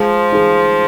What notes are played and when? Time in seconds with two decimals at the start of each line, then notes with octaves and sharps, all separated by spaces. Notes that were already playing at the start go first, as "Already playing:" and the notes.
Already playing: F3 G#3
0.32 D#4 G#4